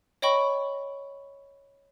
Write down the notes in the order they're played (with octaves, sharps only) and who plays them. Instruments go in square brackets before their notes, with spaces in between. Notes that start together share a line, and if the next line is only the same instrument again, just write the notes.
[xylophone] C#5 D#5 G5 B5 C#6